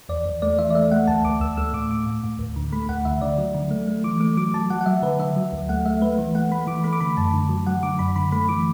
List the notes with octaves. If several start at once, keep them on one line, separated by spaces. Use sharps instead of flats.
E2 D5
E2
A3 D5
E3 E5
D5
A3 E5
A3 F#5
D2 A5
D2 D6
D2 E6
A3 E6
A2 D6
A2 D6
A2
A2
D2
D3
A3 B5
D2 F#5
D3 E5
D3 D5
F#3
D3
A3
A3
E3 D6
A3 D6
F#3 D6
F#3 A5
F#3 F#5
F#5
F#3 E5
D3 B4
D3 E5
F#3
D2
A3 F#5
A3 E5
A3 B4
E3
A3 F#5
A3 B5
E3 D6
A3 B5
D6
D3 B5
F#2 A5
D3
F#3
F#3 F#5
D3 D6
F#2 B5
D3 B5
A3 B5
E3 D6